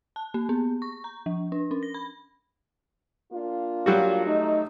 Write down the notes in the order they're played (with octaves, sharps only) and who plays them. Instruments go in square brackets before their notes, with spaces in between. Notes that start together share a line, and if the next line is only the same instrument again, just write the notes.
[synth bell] A5
A#3
B3
C#6
A#5
F3
D4
C#4
A#6
B5
[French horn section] A#3 D4 F4
[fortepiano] F#3 G3 F#4
[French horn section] A3 D#4